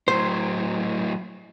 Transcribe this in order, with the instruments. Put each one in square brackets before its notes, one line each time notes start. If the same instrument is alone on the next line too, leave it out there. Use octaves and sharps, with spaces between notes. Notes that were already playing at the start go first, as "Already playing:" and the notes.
[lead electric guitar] A2 F#3 [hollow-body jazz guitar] C5